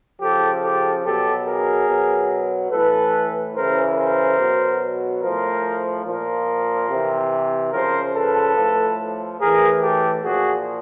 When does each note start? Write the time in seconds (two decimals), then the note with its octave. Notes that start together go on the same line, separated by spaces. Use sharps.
0.21 C#3 F3 G4 A4
0.63 G4 A4
1.05 B2 F#3 G4 A4
1.46 G#4 A#4
1.88 B2 F#3
2.71 A2 E3 A4 B4
3.55 C#3 E3 A#4 C5
3.97 A#4 C5
4.39 B2 F#3
5.23 A2 F3 A#4 C5
6.06 A#2 F3 A#4 C5
6.89 C3 E3
7.73 C#3 F3 A#4 C5
8.15 A4 B4
8.57 A2 F3
9.40 A2 E3 G#4 A#4
9.82 G4 A4
10.24 A#2 F3 F#4 G#4